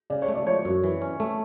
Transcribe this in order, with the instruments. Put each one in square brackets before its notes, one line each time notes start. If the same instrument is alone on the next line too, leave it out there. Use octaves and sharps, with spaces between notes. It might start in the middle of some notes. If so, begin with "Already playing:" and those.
[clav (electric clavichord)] C#3 [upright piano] D5
[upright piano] C#5
[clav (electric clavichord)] A3
[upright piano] D5
[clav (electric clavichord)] F3 [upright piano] C#5
[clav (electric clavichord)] F#2
E3
C#4
A3